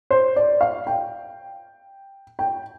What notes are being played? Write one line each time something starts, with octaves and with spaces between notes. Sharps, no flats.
C5
D5
F5
G5
G5